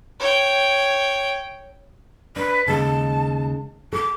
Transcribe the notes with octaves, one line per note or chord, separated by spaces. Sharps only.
C#5 G5
D4 B4
D#2 C#3 G#3 A5
A4 D6